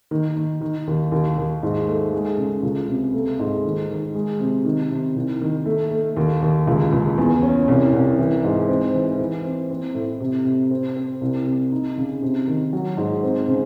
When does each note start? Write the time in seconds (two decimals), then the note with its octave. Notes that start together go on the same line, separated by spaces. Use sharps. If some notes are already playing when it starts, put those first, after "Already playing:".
0.11 D#3
0.36 D#3
0.61 D#3
0.87 D#2
1.12 D#2
1.38 D#2
1.63 G#2
1.88 A3
2.13 G#3
2.38 C#3
2.63 C#2
2.89 C3
3.14 A3
3.39 G#2
3.65 D#3
3.90 D#3
4.15 G#3
4.40 C3
4.65 D#3
4.91 C3
5.16 C2
5.41 D#3
5.66 A3
5.91 A3
6.16 D#2
6.42 D#2
6.68 C#2
6.93 C#2
7.18 E2
7.42 C#4
7.68 C2
7.93 C2
8.19 E3
8.44 G#2
8.69 C4
8.94 E3
9.20 E3
9.44 C4
9.70 C4
9.95 A2
10.21 C3
10.45 C3
10.71 C4
10.97 C4
11.21 C2
11.47 C3
11.72 D#4
11.98 C#3
12.22 C3
12.48 D#3
12.73 F#3
12.97 G#2
13.23 C4
13.48 C#3